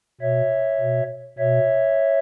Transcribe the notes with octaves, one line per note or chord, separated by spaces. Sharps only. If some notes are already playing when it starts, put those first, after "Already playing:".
B2 C#5 E5
B2
B2 C#5 E5